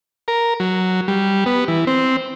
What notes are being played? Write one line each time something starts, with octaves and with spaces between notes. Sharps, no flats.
A#4
F#3
G3
B3
E3
C4